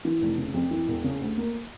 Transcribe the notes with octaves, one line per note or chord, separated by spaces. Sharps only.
E3
F1
C#3
F2
E3
E1
C#3
D2
A#3